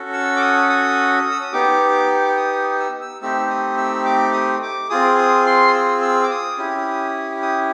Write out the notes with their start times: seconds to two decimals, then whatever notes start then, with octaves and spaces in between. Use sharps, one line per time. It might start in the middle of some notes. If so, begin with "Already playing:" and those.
Already playing: C#4 F#4 A4
0.13 E6
0.37 D6
0.41 D#6
0.69 D#6
1.31 E6
1.42 D#6
1.53 B3 D#4 G4 D6
2.37 D#6
2.80 E6
3.01 E6
3.22 A3 C4 D#4 G4 E6
3.50 D#6
3.77 E6
4.05 D6
4.33 D#6
4.62 D6
4.90 C4 F4 G#4 D#6
5.18 D#6
5.46 C6
5.67 D#6
5.74 E6
6.02 E6
6.23 D6
6.31 D#6
6.58 C#4 E4 G4
7.42 D#6